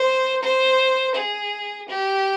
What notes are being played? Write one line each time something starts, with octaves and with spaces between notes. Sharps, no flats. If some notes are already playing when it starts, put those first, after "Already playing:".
Already playing: C5
C5
G#4
G4